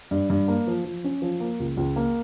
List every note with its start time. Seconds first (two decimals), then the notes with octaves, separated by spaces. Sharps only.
0.11 G2
0.30 G2
0.48 A#3
0.67 F3
0.85 F3
1.04 C#4
1.22 F3
1.40 A#3
1.59 C#2
1.77 C#2
1.96 A#3